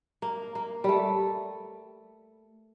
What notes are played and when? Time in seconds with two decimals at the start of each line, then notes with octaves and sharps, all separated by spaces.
0.22 A#3
0.55 A#3
0.84 G3 A3